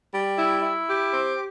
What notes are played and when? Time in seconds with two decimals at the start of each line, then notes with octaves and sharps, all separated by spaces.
0.13 G3
0.38 E4
0.62 E4
0.88 G4
1.13 C4